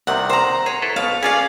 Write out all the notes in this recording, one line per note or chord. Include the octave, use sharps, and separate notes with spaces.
C2 C3 D#3 F#5
C5 A#5
G#4 C#5
E4 A4 B4
B1 B2 F5
C#4 F4 G#4 D5 F5